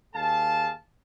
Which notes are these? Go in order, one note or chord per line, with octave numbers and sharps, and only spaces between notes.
D#2 G#4 F5 A5